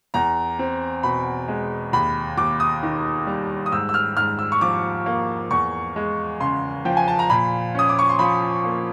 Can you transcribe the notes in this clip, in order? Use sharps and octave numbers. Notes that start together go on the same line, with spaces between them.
E2 A#5
C4
B2 B5
G#3
D#2 B5
D#2 D6
D#6
D#3
G3
D#6
G#2 E6
E6
F6
G#2 F6
E6
C#6
F3 D6
A#3
E2 C#6
G#3
C#3 C6
F3 G5
G#5
A5
A#5
A#2 B5
C#4 D#6
D6
C#6
C6
F3 B5
A#3